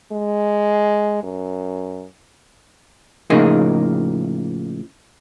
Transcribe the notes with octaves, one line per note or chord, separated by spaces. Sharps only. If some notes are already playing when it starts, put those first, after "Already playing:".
G#3
F#2
A2 C#3 F3 A#3 D#4 G#4